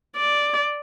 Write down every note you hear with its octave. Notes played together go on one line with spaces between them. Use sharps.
D5